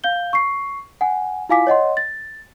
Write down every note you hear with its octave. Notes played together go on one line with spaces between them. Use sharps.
F5 G6 G7
C#6 C7
F#5 G#5
E4 F4 F5 G#5 D6 B6
C#5 D#5 F#5 C6
A6